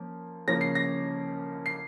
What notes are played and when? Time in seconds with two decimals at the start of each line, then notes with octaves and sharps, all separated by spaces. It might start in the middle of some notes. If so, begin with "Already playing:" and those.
Already playing: F3 A#3 C#4
0.48 C#3 F3 A#3 C#4 A#6
0.61 C7
0.75 A#6
1.66 C7